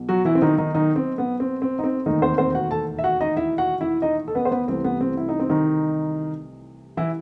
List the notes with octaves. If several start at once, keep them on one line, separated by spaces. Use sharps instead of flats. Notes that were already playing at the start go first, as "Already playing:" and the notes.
Already playing: B1 B2
F#3 F#4
E3 E4
C4
D#3 D#4
D#3 D#4
D#3 D#4
C4
B3
C4
C4
D#4
C4
E1 D#2 D#3 A3 D#4
C4 C5
C4 C5
F#4 F#5
A4 A5
E5
F#4 F#5
D#4 D#5
E4 E5
F#4 F#5
E4 E5
D#4 D#5
A4
B3 B4
C5
B3 B4
C2 C3 E3 A3 C4
B3
C4
E4
D#4
C4
D#3 D#4
E3 E4